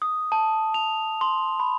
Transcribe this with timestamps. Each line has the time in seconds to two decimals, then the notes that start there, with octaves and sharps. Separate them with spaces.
0.02 D#6
0.32 A5
0.74 F7
1.21 C6
1.60 B5